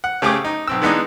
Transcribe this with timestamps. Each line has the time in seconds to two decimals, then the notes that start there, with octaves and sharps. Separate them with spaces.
0.04 F#5
0.22 C#3 A3 G4 G#4 G5 D6
0.45 D#4
0.68 B1 C4 E6
0.82 E3 G#3 B3 D4 D#4